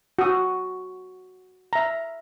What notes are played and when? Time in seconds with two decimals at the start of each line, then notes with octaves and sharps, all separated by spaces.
0.19 F#4 D#6
1.73 E5 A#5